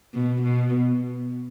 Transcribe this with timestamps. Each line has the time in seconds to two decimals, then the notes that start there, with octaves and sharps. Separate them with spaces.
0.14 B2
0.43 B2